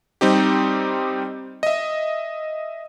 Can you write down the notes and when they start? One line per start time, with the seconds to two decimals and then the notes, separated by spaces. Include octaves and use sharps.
0.21 G3 C4 D#4 G4
1.63 D#5 E5